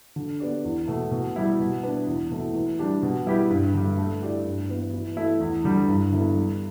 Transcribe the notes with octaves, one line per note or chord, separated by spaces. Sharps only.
D3
B3 G4 D5
E2
B2 A3
B2
G3 E4
B2
B3 D4 B4
E2
B2 A3 E4
E3
G3 D4 G4
B2
G3 E4 G4 B4
G2
D3 G3
A3
E4 G4 D5
G2
E3 B3
E3
A3 E4
E2
D3 G3
G2
D3 B3 E4 A4
G3